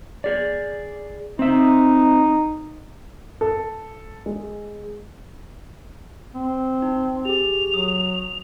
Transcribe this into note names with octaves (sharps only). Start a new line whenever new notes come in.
G#4 D5
C4 D#4 E5
A4
G#3
C4
D#4
G4 G#4 F7
F#3 D#6